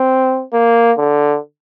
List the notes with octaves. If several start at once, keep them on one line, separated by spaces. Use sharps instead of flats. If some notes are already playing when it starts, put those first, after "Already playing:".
Already playing: C4
A#3
D3